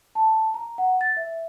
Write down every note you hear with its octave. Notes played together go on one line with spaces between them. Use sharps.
A5
A#5
F#5
A6
E5